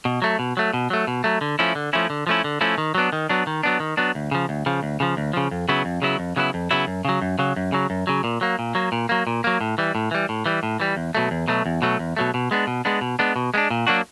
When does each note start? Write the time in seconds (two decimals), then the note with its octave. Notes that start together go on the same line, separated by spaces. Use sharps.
0.05 B2
0.22 F#3 A3
0.39 B2
0.57 F#3 A3
0.73 B2
0.90 F#3 A3
1.07 B2
1.24 F#3 A3
1.41 D3
1.59 F3 A3 C#4 E4
1.75 D3
1.93 F3 A3 C#4 E4
2.10 D3
2.27 F3 A3 C#4 E4
2.44 D3
2.61 F3 A3 C#4 E4
2.78 D#3
2.95 F#3 B3 D4
3.13 D#3
3.29 F#3 B3 D4
3.47 D#3
3.63 F#3 B3 D4
3.80 D#3
3.97 F#3 B3 D4
4.15 D2
4.31 C#3 F3
4.49 D2
4.66 C#3 F3
4.83 D2
5.00 C#3 F3
5.17 D2
5.33 C#3 F3
5.51 F2
5.69 C#3 F#3 B3 E4
5.85 F2
6.02 C#3 F#3 B3 E4
6.19 F2
6.36 C#3 F#3 B3 E4
6.54 F2
6.71 C#3 F#3 B3 E4
6.87 F#2
7.05 C#3 F#3
7.22 F#2
7.39 C#3 F#3
7.56 F#2
7.72 C#3 F#3
7.90 F#2
8.07 C#3 F#3
8.24 A#2
8.41 F#3 A#3
8.59 A#2
8.75 F#3 A#3
8.92 A#2
9.09 F#3 A#3
9.27 A#2
9.44 F#3 A#3
9.61 A2
9.78 E3 G3
9.95 A2
10.11 E3 G3
10.29 A2
10.46 E3 G3
10.63 A2
10.80 E3 G3
10.97 E2
11.15 B2 F#3 A3
11.31 E2
11.48 B2 F#3 A3
11.66 E2
11.82 B2 F#3 A3
11.99 E2
12.17 B2 F#3 A3
12.34 B2
12.51 G#3 B3 D4
12.67 B2
12.85 G#3 B3 D4
13.01 B2
13.19 G#3 B3 D4
13.36 B2
13.54 G#3 B3
13.58 D4
13.70 A#2
13.87 F#3 A#3 D4 F#4